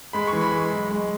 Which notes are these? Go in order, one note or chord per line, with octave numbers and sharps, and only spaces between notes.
G#3 B5
C#6
E3
B5
G#3
B1
G#3